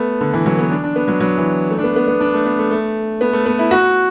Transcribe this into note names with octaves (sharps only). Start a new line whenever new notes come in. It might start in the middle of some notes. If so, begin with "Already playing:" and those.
Already playing: A3 B3
D3
E3
F#3
B3
D4
D4
B3
F#3
F#3
E3
A3
D4
B3
B3
B3
D4
A3
B3
A3
A3
B3
A3
B3
E4
F#4